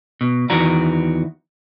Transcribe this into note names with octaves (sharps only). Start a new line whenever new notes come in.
B2
E2 D#3 E3 F#4 D5 A#5